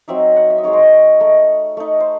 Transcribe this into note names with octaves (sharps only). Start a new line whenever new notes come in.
F#3 C4 D#4 E5
F#5
E5
D#5
G#3 D#4 C#5
C5
C#5 D#5
A3 D#4
A3 D#4
C5